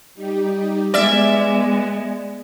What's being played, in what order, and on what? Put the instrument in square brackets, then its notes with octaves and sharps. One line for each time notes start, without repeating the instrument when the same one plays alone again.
[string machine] G3 D#4 G4
[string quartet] G#3 [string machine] B3 [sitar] D5 E5